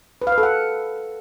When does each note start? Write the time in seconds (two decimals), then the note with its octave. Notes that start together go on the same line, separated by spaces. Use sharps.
0.22 B4
0.27 F5
0.32 B4
0.38 A4
0.43 F#5